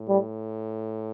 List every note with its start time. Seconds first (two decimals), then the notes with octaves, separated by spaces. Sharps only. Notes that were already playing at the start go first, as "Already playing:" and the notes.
Already playing: A2
0.09 G3